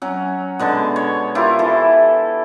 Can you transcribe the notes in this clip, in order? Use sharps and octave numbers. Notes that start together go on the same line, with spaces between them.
F#3 C#4
B2 D3 G#3 A5
C#5
E4 F4 G4 A#4
E3 A4